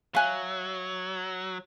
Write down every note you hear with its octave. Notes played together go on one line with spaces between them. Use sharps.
F#3 E5 F5 G#5 F#6